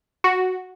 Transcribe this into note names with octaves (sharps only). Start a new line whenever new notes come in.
F#4